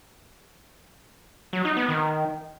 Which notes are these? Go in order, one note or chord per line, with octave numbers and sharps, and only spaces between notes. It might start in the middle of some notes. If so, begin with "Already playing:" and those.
F#3
D#4
B3
D#3